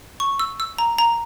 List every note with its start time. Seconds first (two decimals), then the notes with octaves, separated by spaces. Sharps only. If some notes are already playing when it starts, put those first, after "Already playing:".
0.20 C#6
0.39 E6
0.60 E6
0.78 A#5
0.98 A#5